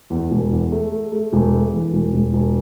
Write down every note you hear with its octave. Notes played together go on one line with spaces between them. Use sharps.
E2
E1
E2
A3
A3
A3
E1
A3
E3
E1
E1
E1